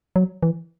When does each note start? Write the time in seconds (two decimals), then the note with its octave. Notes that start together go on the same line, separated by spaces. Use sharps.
0.16 F#3
0.43 E3